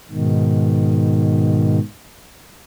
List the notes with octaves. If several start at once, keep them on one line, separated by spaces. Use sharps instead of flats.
G#2 B2 D#3